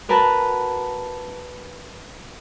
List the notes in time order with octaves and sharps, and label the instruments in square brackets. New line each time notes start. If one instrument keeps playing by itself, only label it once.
[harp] F#4 A#4 B4 A5 B5 F#6